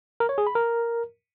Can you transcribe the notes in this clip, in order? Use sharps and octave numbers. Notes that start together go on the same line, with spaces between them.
A#4
C#5
G#4
B5
A#4